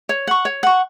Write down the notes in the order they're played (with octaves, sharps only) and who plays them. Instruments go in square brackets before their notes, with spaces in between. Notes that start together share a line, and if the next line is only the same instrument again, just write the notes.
[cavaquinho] C#5
F#5 C#6
C#5
F#5 C#6